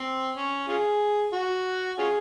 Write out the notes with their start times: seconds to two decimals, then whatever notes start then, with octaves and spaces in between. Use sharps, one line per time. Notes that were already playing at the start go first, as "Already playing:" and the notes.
Already playing: C4
0.36 C#4
0.68 C#4 F4 G#4
1.33 F#4
1.98 C#4 F4 G#4